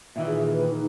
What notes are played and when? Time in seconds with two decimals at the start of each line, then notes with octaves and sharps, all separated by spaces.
0.16 A#2 D#3 E3 E5
0.27 G#4
0.54 B4
0.70 D#4